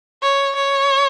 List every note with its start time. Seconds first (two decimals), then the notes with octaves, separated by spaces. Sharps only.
0.22 C#5
0.55 C#5